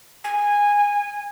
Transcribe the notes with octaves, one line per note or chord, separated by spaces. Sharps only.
G#5